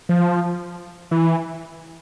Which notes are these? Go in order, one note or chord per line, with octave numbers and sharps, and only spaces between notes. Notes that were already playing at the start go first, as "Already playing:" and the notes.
F3
E3